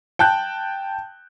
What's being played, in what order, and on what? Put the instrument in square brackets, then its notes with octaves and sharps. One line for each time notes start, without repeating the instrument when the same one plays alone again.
[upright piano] G5 A5 F#6 G6